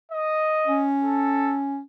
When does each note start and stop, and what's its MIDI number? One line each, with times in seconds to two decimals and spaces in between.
0.12 0.86 75
0.67 1.81 61
1.04 1.56 69